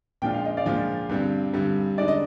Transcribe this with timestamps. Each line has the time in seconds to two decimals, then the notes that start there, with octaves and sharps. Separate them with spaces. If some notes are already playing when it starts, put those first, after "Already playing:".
0.22 A#2 F3 G#3 D4 F4 G5
0.33 F5
0.45 D#5
0.57 D5 F5
0.65 A#2 F3 G#3 D4 F4
1.09 G2 D3 G3 C4
1.54 G2 D3 G3 C4
1.98 D3 G#3 D#4 D5
2.08 D#5